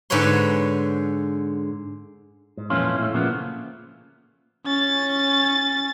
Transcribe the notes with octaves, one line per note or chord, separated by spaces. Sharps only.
G#2 D3 B4 C#5 C6
G#2
F2 A#2 E3 A3 C#4 F4
A2 A3
A#2 C#3 F3 A#3 B3
C#4 A6